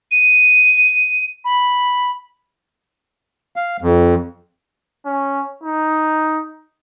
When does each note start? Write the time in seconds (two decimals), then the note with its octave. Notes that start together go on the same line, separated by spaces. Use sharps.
0.11 D#7
1.45 B5
3.56 F5
3.82 F2
5.06 C#4
5.63 D#4